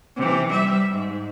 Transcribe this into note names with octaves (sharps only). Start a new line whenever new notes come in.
C3 E3
G3 E5
G#2